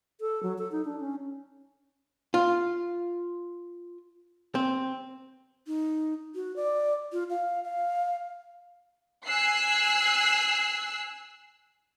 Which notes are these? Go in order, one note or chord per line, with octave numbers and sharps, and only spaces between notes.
A4
F#3
A4
D#4
D4
C#4
F4
C4
D#4
F#4
D5
F4
F5
F5
G#5 E6 F#6 C7